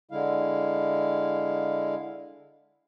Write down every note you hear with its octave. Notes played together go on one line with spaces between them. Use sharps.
D3 G#3 E4 F5